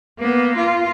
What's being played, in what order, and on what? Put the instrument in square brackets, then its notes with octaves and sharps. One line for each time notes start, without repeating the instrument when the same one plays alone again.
[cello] A#3 B3
F4